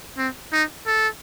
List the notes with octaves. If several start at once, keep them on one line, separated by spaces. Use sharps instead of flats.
C4
D#4
A4